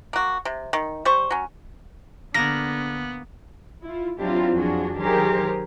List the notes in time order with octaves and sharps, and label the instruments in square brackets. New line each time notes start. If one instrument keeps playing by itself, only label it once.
[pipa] A#3 F#4
C3
D#3
G3 C5 C#6
F#3 C#4
[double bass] D3 [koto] A#3 A#4 [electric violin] B3 [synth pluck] A#6
[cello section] E4 F4
F#3 C4 D4 E4 F4 G4
F2 F#3 D4 F4 F#4 G#4
D#3 F#3 G4 G#4 A#4 C5